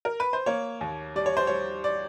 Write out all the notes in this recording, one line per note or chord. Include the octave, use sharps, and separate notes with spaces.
A#4
B4
C5
A#3 C#5
D#2
G3 D5
C#5
C5
G3 C#5
D5